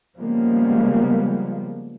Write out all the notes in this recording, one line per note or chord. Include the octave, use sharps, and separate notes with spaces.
C#3 F3 G3 G#3 A#3 B3